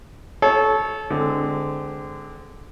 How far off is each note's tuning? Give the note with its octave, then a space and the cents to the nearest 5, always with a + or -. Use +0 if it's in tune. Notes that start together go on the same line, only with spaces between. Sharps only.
A4 -25 C#5 +0
D3 +0 G#3 +0 C4 -25